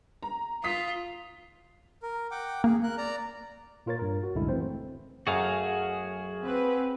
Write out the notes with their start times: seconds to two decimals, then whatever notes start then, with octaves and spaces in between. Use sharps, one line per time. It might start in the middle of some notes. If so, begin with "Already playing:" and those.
0.23 A#5
0.64 F4 D#6 B6
2.02 A#4
2.31 F#5 G5 D6
2.64 A#3 G#4
2.83 A#4 F#6
2.98 D5 A#5
3.86 A#2 F4 A#4 C#5 A6
3.99 G2 A#4
4.23 F#4
4.35 C2 F#2 A2 D3 G#3 E4
4.49 E3 A3 C4 C5
5.27 F#2 A3 F#4 G#4 F5 F#5
6.44 C4 B4